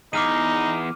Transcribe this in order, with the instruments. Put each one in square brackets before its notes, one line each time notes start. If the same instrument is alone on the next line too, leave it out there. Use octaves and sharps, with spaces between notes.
[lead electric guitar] E2 [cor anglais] D#4 [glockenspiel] D6 F6 D#7